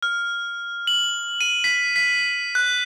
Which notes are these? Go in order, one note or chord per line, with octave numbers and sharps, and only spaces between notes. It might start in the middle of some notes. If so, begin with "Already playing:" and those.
F6
F#7
D#7
B6
B6
F#6